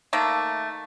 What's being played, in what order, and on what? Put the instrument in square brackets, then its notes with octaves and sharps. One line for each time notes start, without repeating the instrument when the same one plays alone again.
[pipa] D#3 A3 A#3